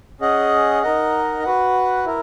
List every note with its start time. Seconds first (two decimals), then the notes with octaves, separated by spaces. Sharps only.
0.21 C#4 G#4 D#5 F#5
0.82 D#4 A#4 D#5 F#5
1.44 F#4 B4 F#5
2.05 E4 A#4